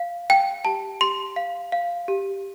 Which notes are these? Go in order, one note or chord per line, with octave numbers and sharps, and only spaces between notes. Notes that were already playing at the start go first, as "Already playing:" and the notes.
Already playing: F5
F5 G5
G4 A5
G4 C6
F5
F5
G4